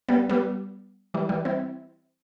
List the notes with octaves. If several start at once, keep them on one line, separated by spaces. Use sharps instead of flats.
G3 B3
G3 B3
E3 G3
E3 G3
C4 E4